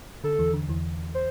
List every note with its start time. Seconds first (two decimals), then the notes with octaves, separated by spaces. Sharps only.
0.24 D3 A4
0.39 E2 E3
0.54 D3
0.69 E2 E3
1.14 C5